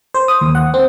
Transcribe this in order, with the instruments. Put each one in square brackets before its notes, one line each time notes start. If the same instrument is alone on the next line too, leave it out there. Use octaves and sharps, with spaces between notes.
[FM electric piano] C5
D#6
D#2
F#5
C4